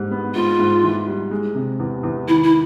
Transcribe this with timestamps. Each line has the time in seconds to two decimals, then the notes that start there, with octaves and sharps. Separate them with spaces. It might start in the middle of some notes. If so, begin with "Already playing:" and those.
Already playing: G#2 G3
0.11 B3
0.34 G#2 F4
0.59 G#2
0.83 E3
1.07 G3
1.31 G#3
1.55 C3
1.79 E2
2.03 E2
2.28 D#3 E4
2.43 E4